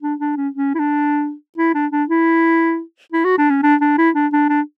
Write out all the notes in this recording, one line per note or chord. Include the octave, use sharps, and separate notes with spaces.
D4
D4
C#4
C#4
E4
D4
E4
D4
D4
E4
E4
F#4
D4
C#4
D4
D4
E4
D4
D4
D4